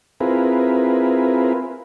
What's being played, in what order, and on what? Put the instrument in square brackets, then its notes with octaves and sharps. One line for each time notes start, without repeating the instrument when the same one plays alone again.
[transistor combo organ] C4 E4 F4 G#4 A#4 B4